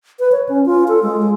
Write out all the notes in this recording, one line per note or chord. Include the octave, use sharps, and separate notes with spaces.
B4
C#5
C#4
F4
A4
G#3